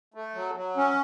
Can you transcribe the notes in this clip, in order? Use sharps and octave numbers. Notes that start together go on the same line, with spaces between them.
A3
F#3
F#3
C#4